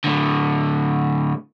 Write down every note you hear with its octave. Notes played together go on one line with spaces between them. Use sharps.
A2 D3